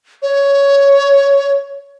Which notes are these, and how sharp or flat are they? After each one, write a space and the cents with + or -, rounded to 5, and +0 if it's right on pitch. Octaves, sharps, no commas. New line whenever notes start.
C#5 +10